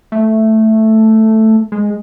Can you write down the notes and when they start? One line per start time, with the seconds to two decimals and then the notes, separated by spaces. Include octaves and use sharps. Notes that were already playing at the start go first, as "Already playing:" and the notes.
0.12 A3
1.72 G#3